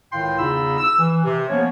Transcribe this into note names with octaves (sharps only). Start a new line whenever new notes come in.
C#2 A2 D#3 F5 G5 C6
E2 C#3 D#4 F4 B5 E6
E6
E3
C3
F3 A#3 B3 C#4 C#5